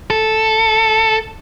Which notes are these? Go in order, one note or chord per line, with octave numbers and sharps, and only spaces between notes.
A4